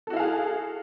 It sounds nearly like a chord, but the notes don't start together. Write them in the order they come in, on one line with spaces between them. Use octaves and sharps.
A4 F#4 E4 F5 G#4